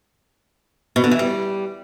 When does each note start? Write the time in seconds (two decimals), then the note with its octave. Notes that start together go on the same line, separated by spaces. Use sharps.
0.96 B2
1.04 D3
1.11 E3
1.19 G3